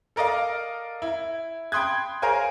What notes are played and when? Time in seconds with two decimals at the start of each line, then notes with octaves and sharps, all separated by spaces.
0.16 A4 A#4 D5 D#5 F5
1.02 E4
1.72 G5 B5 C6 D#6 F#6 G#6
2.22 G#4 A#4 C5 C#5 F5 G#5